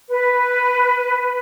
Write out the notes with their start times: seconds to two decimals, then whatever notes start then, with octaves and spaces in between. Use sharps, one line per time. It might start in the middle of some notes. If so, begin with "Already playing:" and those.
0.09 B4